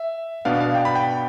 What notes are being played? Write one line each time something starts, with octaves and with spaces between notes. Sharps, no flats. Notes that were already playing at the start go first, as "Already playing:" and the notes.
Already playing: E5
B2 B3 D4 F5
F5
G5
B5
G5